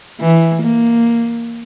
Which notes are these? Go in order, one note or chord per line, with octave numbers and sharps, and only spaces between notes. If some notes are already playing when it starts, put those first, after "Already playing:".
E3
A#3